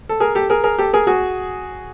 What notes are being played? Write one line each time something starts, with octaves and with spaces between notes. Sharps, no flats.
A4
G#4 A#4
G4 A4
G#4 A#4
G#4 A#4
G4 A4
G#4 A#4
F#4 G#4